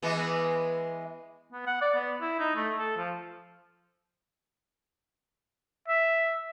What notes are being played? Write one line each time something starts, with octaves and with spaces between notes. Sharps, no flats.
E3 G#3 B3
B3
F#5
D5
B3
E4
D#4
A3
A4
F3
E5